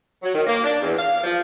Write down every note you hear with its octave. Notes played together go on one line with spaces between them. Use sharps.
F#3
D#3
A#3
D4
E2
F5
F3